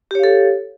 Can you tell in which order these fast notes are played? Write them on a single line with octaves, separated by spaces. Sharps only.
G4 C#5 F5 A4